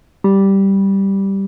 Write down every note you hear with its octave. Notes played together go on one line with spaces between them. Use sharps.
G3